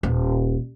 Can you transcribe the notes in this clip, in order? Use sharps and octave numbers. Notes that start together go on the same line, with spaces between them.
D#1